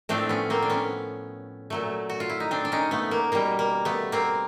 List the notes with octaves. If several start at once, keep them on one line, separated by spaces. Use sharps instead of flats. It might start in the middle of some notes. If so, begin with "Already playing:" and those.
A2 F3 A3 C4 D4
B3 C#4
A#3 C4
D4
B3 C#4
A#2 F#3 A3
F#4
F4
E4
D#4
C4 D4
D4
C#4 D#4
A3 B3
A#3
B2 G3 A#3
A#3
A3 B3
A#3 C4